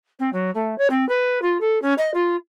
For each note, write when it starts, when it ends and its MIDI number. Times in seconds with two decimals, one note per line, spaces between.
0.19 0.29 60
0.32 0.50 54
0.54 0.77 57
0.78 0.87 73
0.90 1.06 60
1.08 1.41 71
1.41 1.57 65
1.60 1.80 69
1.82 1.93 61
1.98 2.10 75
2.14 2.35 65